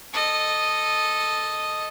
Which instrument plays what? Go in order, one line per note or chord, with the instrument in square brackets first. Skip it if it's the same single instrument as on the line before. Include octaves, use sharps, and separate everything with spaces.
[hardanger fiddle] A4 D#5